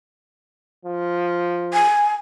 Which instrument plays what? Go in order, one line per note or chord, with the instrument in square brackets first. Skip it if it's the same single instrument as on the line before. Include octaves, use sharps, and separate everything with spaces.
[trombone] F3
[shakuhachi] G#5